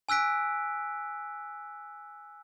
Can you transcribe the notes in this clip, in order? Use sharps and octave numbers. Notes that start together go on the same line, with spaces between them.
G#5 E6 F#6 B6 D7